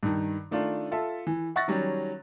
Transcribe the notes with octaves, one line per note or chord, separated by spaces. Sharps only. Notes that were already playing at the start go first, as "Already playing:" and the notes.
G2 D#3
D#3 A3 D4 F4
F4 A4 E5
E3
E5 F#5 C#6 F#6 A6 A#6
D#3 F#3 G3 C#4